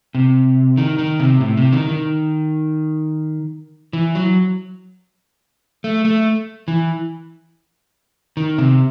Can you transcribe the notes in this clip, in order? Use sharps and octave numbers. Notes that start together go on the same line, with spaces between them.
C3
D#3
D#3
C3
A2
C3
D#3
D#3
E3
F#3
A3
A3
E3
D#3
C3